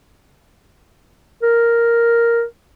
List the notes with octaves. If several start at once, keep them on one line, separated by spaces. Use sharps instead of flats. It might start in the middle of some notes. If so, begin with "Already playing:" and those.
A#4